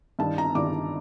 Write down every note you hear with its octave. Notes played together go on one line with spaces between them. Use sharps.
G2 D#3 G3 A5
A#5
G2 D#3 G3 D6